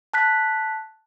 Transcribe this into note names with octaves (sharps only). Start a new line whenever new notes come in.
A5 F#6 B6